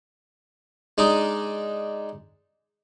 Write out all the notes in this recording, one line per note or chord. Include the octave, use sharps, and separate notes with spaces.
G#3 D4 D#4